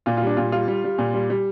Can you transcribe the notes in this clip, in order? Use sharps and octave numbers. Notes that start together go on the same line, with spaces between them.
A#2 F4
F4
G3 D4
A#2 F4
G3 F4
G3
G3
A#2
G3
G3